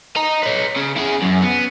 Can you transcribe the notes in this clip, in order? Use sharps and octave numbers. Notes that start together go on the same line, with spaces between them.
D#5 A#5
B4 C#5
C#3
E4 G#4
F#2
B3